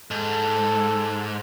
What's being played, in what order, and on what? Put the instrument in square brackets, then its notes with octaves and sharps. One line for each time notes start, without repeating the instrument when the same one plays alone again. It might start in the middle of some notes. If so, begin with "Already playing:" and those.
[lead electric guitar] G#2 [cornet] A4